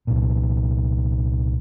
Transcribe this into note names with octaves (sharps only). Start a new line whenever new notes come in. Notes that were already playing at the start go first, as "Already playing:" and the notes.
C2 A#2